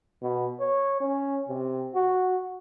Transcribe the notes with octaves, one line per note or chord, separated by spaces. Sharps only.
B2
C#5
C#4
C3
F#4